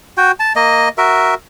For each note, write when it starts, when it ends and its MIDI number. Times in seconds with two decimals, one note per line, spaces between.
0.17 0.32 66
0.17 0.32 79
0.40 0.53 81
0.56 0.89 58
0.56 0.89 75
0.98 1.34 66
0.98 1.34 70
0.98 1.34 76